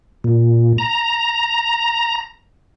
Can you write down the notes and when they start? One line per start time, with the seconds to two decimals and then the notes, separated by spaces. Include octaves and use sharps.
0.24 A#2
0.78 A#5